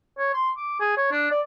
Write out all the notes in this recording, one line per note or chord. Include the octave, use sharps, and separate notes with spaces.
C#5
C6
D6
G#4
C#5
D4
D5